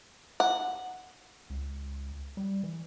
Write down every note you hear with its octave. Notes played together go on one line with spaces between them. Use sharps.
F#5
C#2
G3
E3